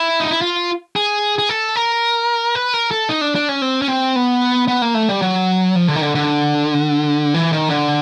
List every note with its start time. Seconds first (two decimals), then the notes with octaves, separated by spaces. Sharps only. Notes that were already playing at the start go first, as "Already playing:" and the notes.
Already playing: E4
0.20 D#4
0.31 E4
0.42 F4
0.96 G#4
1.39 G#4
1.49 A4
1.76 A#4
2.55 B4
2.74 A#4
2.91 A4
3.09 D#4
3.21 D4
3.35 D4
3.49 C#4
3.62 C4
3.82 C#4
3.88 C4
4.16 B3
4.68 B3
4.82 A#3
4.94 A3
5.09 G3
5.22 F#3
5.76 F3
5.88 D3
5.96 D#3
6.02 D3
6.15 D3
7.34 E3
7.53 D#3
7.70 D3